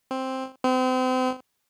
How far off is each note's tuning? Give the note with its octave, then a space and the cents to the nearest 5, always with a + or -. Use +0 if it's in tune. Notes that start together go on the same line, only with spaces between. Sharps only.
C4 +5
C4 -35